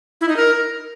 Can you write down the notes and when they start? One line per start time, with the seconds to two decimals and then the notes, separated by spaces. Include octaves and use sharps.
0.21 E4
0.29 D#4
0.36 A#4